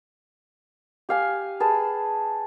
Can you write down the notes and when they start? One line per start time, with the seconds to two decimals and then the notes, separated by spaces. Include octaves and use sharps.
1.09 G4 F5 G#5
1.60 G#4 B4 A5 E6